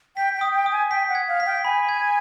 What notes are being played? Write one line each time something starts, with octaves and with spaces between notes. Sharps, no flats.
G5 B6
G5
D#6
G5
D#6
G#5
G5 B6
F#5
G#6
F5
B6
G5
G#5 B5
G#6